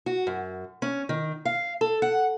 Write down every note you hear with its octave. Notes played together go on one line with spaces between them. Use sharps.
F#4
F#2
C#4
D#3
F5
A4
F#5